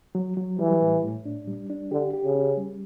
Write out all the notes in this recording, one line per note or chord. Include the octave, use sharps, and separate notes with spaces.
F#3
F#3
E3 G3
A2
A2
D4
G3
D4
D3 G4
G4
C#3
C#4
G3